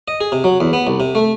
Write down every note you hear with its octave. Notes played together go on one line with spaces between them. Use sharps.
D#5
G#4
C3
F#3
E2
B3
C2
C3
A3